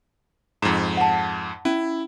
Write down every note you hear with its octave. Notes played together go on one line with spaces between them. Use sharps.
F2 G#2 A#5
F#5 A5
C#4 E4